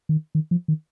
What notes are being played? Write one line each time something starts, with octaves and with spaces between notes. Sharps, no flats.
D#3
D#3
F3
D#3